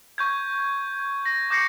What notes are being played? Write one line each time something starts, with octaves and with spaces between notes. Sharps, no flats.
C#6 G6 G#6
A#6
D6 G6 A#6 C7 C#7